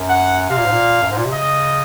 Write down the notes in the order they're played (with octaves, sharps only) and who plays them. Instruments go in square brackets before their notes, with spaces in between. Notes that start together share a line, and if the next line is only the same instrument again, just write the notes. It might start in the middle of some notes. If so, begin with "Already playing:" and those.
Already playing: [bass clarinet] F#2
[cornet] F#5
[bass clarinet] C3 [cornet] F5
[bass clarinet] A#2
G#2
A#2
F#2
G#2
A#2
C3
[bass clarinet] C#3 [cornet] D#5